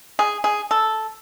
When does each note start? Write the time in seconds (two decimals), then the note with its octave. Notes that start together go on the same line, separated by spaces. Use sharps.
0.19 G#4
0.44 G#4
0.71 A4